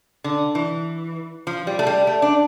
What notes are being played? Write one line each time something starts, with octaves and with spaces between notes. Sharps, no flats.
D3
E3
F3
G3
A3
G3
A3
D4